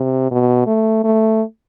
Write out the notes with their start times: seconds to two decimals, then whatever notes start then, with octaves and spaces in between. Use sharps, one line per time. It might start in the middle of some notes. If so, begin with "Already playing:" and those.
Already playing: C3
0.31 B2
0.67 A3
1.04 A3